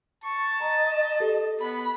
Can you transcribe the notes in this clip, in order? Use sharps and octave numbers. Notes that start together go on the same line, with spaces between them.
A5 C#6
D#5 A#5
G4 A4
B3 B5